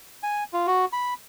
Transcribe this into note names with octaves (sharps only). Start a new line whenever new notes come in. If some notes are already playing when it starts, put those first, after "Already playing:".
G#5
F4
F#4
B5